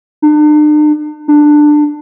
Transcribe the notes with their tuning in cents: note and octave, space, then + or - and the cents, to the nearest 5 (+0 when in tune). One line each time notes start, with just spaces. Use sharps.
D4 +45
D4 +15